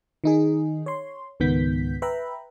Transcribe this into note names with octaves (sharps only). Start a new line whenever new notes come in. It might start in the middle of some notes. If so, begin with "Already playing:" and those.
D#3 D#4 G#4
C#5 C6
C#2 G#2 D#3 B3 G6 B6
B4 E5 G5 A#5 B5